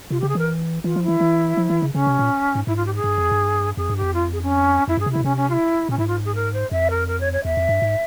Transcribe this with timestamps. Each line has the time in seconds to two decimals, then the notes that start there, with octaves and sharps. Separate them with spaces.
0.11 C3 F4
0.20 C#3 G4
0.29 G#4
0.35 E3 A#4
0.83 E3 F4
0.96 F3
1.03 E4
1.08 E3
1.20 E3
1.57 F3
1.70 E3
1.82 C#3
1.94 C#3 C#4
2.07 C3
2.19 A#2
2.55 G#2
2.67 G#2 E4
2.76 F4
2.86 G4
2.95 G#4
3.04 G2
3.18 F2
3.31 G2
3.77 F2 G#4
3.90 G2
3.96 G4
4.01 F2
4.14 F4
4.33 G#4
4.42 C#4
4.88 F2 E4
4.97 G2 G#4
5.06 C3
5.12 C#3 E4
5.20 A#2
5.24 C3 C#4
5.37 C#4
5.49 F4
5.53 E4
5.89 A#2 C#4
5.98 G#2 E4
6.07 F4
6.25 G#4
6.35 A#4
6.53 C5
6.71 F2 E5
6.90 A#4
7.07 A#4
7.20 C#5
7.32 C#5
7.44 E2 E5
7.57 F2
7.69 G2
7.82 G#2